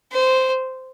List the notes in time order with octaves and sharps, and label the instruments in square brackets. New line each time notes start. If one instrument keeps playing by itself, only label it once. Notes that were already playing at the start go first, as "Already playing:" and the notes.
[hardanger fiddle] C5